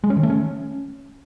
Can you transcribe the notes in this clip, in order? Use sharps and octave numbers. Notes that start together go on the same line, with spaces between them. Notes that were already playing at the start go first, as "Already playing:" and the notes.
G#3
C#4
D#3
A3
C#4